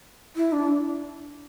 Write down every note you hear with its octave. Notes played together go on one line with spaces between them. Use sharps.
E4
D4